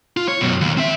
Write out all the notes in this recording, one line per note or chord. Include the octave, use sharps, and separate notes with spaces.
F4
C#5
F#2 B2
D#2
C4 E5